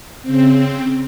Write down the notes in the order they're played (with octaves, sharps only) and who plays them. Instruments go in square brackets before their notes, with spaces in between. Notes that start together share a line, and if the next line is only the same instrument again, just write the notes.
[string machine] C#3 C4